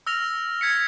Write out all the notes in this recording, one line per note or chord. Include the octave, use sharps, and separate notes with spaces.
E6 F6 A#6 F7
G#6 B6 C#7